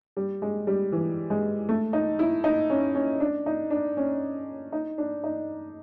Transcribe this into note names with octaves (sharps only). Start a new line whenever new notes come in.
G3
G#3
G3
E3
G#3
A3
D#4
E4
D#4
C#4
C#4
D4
D#4
D4
C#4
D#4
D4
D#4